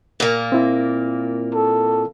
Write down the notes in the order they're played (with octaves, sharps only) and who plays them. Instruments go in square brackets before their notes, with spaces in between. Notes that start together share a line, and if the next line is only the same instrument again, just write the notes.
[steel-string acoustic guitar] A#2 A#3
[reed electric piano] C4 E4
[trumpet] A4